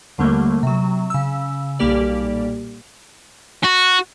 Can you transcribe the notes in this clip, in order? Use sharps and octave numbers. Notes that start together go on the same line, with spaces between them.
D#2 D3 G3 A3 A#3
C3 F#3
C#3 E6
B1 A#2 G3 A#3 G4 D5
F#4